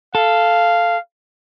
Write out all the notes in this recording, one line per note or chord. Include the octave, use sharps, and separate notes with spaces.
A4 F5